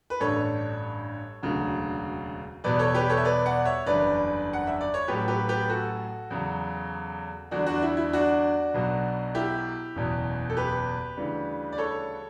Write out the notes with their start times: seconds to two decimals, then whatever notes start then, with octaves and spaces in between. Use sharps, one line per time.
0.10 B4
0.20 A1 G2 D3 G3 A4 C#5
1.42 E1 D2 C#3 F#3
2.64 E2 B2 G3 B4 D5
2.79 A4 C#5
2.94 G4 B4
3.09 A4 C#5
3.17 E5
3.25 B4 D5
3.46 D5 F#5
3.65 C#5 E5
3.86 F#1 E2 D3 G3 B4 D5
4.53 F#5
4.67 E5
4.81 D5
4.94 C#5
5.08 A1 A2 F#3 G4 B4
5.28 G4 B4
5.49 G4 B4
5.69 F#4 A4
6.30 E2 C#3 F#3
7.51 E2 D3 G3 D4 F#4
7.66 D4 F#4
7.82 E4
7.97 E4
8.13 D4 F#4
8.74 B1 B2 F#3
9.35 E4 G4
9.95 F#1 E2 B2
10.50 A4
10.57 G4 B4
11.17 D2 C#3 E3 G3
11.72 D5
11.78 A4 C#5